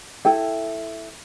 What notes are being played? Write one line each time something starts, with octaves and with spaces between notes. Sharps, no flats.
E4 A4 G5